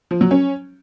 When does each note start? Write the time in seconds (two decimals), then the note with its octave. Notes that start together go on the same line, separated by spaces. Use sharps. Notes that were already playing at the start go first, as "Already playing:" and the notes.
0.11 F3
0.21 F#3
0.31 C#4